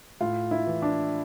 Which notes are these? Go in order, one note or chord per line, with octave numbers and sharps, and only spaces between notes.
A2 F4
E4
E3
D4